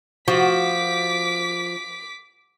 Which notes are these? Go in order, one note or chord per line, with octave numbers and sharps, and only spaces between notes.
F3 F#4 D6 B6